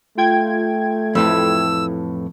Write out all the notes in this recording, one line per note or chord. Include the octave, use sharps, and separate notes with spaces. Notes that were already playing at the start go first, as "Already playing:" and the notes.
A3 F4 G5 G#6
F2 A2 E3 E6